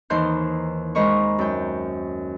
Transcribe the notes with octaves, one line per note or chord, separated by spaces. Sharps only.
D#2 E3 D#4 C5 C6 G6
G#3 A#4 C5 D#5 B5 C#6
F#2 G5